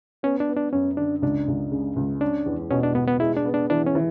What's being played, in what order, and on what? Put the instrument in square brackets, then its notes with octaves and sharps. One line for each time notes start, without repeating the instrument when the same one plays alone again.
[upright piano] B3 [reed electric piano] C#4
[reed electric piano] D4
[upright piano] B3
[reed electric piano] D4
[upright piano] F#2 [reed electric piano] C#4
[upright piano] D3 [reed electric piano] D4
[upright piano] C#2 [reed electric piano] D4
[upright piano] C#2
C#3
C#2
[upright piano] C#4 [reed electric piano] D4
[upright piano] E2
[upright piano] B2 [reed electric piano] C#4
[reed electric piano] D4
[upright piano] B2 [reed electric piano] B3
[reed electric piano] B3
[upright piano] G#3 [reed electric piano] E4
[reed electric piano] D4
[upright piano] B3
[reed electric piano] D4
[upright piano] E3 [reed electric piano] D4
[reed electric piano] C#4
[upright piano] E3